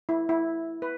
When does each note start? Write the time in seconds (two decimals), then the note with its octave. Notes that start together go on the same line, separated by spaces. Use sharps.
0.09 E4
0.29 E4
0.82 B4